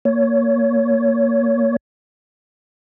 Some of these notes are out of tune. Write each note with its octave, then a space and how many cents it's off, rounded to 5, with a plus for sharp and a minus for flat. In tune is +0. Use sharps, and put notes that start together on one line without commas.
A#3 -5 C#5 +20